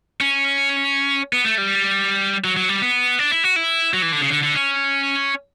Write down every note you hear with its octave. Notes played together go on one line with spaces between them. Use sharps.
C#4
B3
A3
G3
F#3
F#3
G3
B3
D4
E4
F#4
E4
F#3
E3
D3
C#3
D3
D3
C#4